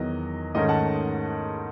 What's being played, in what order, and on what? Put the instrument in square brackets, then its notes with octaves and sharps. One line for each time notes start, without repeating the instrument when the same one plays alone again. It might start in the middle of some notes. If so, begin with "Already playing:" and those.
Already playing: [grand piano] E2 D#3 F#3 D#5
G#2 D#3 A3 C#4 D#5
F#5 A5